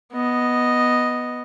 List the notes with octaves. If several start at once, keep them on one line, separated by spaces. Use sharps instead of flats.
B3 D#5